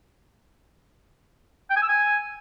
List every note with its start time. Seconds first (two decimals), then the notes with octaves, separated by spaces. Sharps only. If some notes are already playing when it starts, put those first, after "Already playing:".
1.70 G5
1.76 G#5
1.83 E6
1.89 G#5